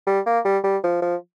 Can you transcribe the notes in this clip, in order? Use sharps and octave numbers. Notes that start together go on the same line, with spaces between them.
G3
A#3
G3
G3
F3
F3